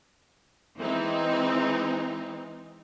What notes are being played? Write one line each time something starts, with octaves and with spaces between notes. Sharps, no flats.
E3 G#3 C4 D#4